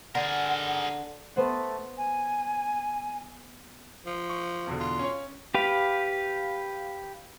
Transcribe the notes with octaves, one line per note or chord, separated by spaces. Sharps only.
D3 G#4 A#4 F#5
A3 B3 C5 F#5
G#5
F3
C#6
E2 B2 D3
F4
C#4 C#5
G4 B4 F5